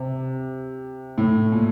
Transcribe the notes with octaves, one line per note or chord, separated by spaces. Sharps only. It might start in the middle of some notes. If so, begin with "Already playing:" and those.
Already playing: C3
A2
A#2